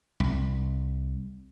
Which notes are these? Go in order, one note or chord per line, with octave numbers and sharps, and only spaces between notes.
C2